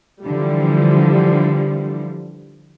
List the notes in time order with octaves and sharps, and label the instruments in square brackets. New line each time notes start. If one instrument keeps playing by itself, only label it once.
[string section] D3 E3 F3 G3